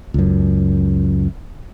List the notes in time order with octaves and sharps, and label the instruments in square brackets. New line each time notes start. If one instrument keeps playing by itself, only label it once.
[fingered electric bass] C#2 F#2